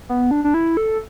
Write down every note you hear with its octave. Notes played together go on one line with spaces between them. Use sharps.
B3
D4
D4
E4
A4